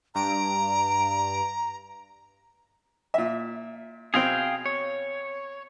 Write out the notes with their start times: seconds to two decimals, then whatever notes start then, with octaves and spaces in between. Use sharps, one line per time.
0.15 G2 A#5 D7
3.14 A#2 E5
4.14 B2 C4 G#4 F5 G5
4.66 C#5